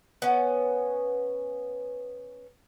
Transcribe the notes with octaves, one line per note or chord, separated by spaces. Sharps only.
B3 C#4